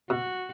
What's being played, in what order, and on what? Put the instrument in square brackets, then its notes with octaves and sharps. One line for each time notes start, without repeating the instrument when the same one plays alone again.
[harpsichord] B2 [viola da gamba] F#4